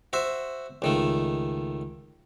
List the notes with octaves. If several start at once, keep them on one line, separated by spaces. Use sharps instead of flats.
F#4 C5 E5
C#2 D#3 A3